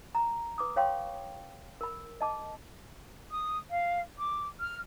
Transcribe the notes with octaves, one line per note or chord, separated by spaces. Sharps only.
A#5
B4 D6 D#6
C#5 F5 G5 C6 C#6
A#4 B5
D#5 A5 D6
D#6
F5
D6
F6